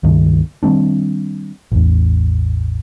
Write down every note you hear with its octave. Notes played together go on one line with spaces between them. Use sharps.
C#2 G2 D#3
D#3 G3 C4 D4
A1 E2